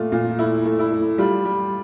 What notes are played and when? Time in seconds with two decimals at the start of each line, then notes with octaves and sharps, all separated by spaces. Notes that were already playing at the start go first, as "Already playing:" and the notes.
Already playing: A#2 A3 F4
0.12 A#2 F4
0.39 A3 E4
0.65 A3
0.79 E4
0.91 A3
1.18 G3 F4
1.45 G3